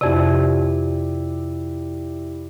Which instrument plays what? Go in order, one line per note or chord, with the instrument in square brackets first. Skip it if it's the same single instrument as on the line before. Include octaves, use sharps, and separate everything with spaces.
[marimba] F2 C3 [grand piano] E4 G4 D5